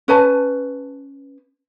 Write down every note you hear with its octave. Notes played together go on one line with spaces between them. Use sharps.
C#4 B4 G#5 A5